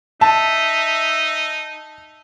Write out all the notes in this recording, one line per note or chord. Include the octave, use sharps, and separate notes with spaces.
D#4 E5 A5